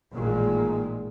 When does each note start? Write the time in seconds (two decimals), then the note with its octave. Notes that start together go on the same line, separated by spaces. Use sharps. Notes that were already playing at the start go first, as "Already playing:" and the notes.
0.12 A1 A#2 D#3 G#3